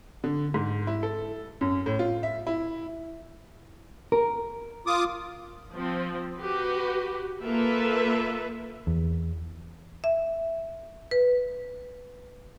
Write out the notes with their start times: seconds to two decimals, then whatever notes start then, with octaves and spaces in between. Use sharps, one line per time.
0.24 D3
0.54 G#2
0.87 E4
1.03 A4
1.61 F#2
1.86 A2
1.99 F4
2.23 E5
2.47 E4
4.12 A#4
4.87 F4 D6 D#6
5.75 F3 C4
6.36 F#4 G4 B4
7.43 A#3 F4 A4 B4 E5
8.87 E2
10.04 E5
11.11 B4